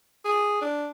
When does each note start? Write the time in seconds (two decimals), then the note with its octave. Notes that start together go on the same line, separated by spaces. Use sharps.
0.25 G#4
0.61 D4